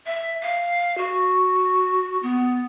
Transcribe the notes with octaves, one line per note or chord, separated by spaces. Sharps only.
E5
F5
F#4
B3